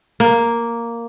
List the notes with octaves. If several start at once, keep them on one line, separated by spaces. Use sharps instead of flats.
A#3